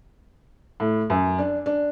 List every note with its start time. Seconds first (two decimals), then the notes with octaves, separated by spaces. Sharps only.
0.80 A2
1.10 F#2
1.38 D4
1.66 D4